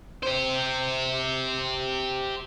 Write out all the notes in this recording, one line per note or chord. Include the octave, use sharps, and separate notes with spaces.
G4 C5